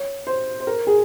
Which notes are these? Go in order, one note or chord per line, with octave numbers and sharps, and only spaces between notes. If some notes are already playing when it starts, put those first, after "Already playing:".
Already playing: C#5
C5
C5
A#4
G#4